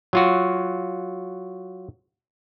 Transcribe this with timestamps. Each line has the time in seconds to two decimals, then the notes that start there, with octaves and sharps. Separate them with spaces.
0.13 F#3 F4 F#4